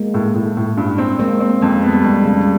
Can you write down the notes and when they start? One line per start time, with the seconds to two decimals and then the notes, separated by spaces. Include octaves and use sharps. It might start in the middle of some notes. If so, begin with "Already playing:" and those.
Already playing: G#3 A#3
0.14 A2
0.35 A2
0.57 A2
0.77 G2
0.98 C4
1.19 G#3 A#3 C4
1.40 C4
1.61 F2 G#3
1.83 B3
1.93 G3
2.04 F2 G#3
2.25 C#3
2.41 G3